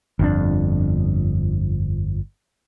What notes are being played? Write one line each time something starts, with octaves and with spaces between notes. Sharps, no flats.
G1 F2 D4